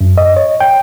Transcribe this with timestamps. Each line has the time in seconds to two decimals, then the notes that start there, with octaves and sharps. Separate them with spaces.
0.01 F#2
0.18 D#5
0.36 C#5
0.60 G5